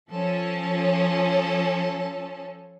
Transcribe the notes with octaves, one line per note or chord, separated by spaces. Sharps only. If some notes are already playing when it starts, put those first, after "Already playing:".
F3 C#4 A4